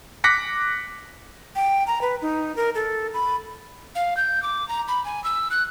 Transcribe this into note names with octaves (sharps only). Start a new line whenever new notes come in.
D6 F#6 A#6 B6 C#7
G5
A#5
B4
D#4
A#4
A4
B5
F5
G6
D6
A#5
B5
G#5
E6
F#6